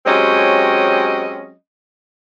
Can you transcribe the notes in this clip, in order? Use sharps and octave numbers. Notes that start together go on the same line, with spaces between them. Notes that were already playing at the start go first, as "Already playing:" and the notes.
F#3 G#3 C4 C#4 G4 D#5